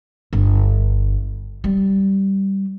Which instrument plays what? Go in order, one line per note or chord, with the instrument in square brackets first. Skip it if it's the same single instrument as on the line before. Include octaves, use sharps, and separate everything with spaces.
[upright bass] G1
G3